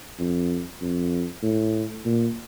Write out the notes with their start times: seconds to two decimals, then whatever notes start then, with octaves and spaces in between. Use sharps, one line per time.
0.19 F2
0.81 F2
1.43 A2
2.05 A#2